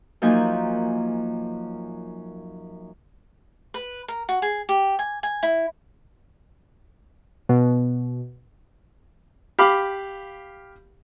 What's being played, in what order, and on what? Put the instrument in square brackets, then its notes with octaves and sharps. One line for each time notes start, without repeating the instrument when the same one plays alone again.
[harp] F#2 F3 A#3 D#4 G#5
[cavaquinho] B4
A#4
F#4
G#4
G4
G#5
G#5
E4
[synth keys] B2
[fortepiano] G4 F5 B5 D6